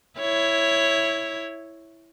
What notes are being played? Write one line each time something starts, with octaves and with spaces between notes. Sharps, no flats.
E4 C#5